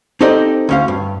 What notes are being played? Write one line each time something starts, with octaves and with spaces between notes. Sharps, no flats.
C4 D#4 G4 A4 D5 D#5
D2 C#4 F5
G2